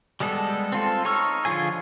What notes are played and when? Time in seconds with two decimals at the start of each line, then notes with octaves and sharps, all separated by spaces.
0.20 G3 G#3 B3 A4
0.72 C4 F4 A4
1.05 D#4 C#5 C#6 E6 F6
1.45 D3 F3 F4 G#4 G#5